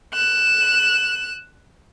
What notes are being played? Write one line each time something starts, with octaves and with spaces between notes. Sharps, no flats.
F#6 E7